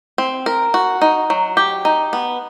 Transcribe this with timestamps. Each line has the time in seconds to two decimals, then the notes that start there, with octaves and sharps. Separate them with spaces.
0.18 C4
0.46 A#4
0.74 F#4
1.02 D#4
1.30 F#3
1.57 G4
1.85 D#4
2.13 B3